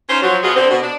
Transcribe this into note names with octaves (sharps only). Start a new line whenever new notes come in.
C#4 D#4 F4 C5
F3 F#3
B2 B3 F4 F#4 G#4 D#5
D3 C4
B2
D4